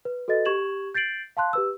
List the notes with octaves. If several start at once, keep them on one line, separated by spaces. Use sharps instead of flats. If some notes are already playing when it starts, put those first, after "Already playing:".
B4
F#4 A4 B4 D#5 A6
G4 C#6 G#6 E7 F#7
G6 A6 C7 D7 F#7
F5 A5 C6 F#6
G4 B4 E6